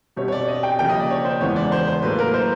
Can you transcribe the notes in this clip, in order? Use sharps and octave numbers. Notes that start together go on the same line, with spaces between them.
B2 G3 C4 C#5
C#5
D5
D#5
G5
C#3 F3 A#3 G5
D#5
D5
C#5
C5
E2 C#3 E3 G#3 B3 C#5
D5
C5
C5
A2 F#3 A#3 B4
A#4
C5